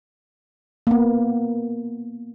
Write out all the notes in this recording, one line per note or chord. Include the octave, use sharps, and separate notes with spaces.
A#3 B3